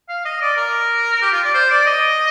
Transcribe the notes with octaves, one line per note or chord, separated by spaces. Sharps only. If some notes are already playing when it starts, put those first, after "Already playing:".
F5
D#5
D5
A#4
G4
F4
D5
C5
D5
D#5